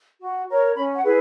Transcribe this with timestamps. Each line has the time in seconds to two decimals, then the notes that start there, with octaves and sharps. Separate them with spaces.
0.21 F#4
0.49 A#4 C#5
0.76 C#4 B5
0.95 F#5
1.04 E4 G#4 B4